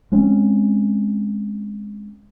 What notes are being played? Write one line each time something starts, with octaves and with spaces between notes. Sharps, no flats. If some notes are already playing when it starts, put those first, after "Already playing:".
G#3 C4 C#4